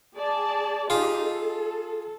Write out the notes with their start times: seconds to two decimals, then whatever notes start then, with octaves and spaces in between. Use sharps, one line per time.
0.15 G#4 D5 A5
0.90 D#4 F4 G4 G#4
1.22 A4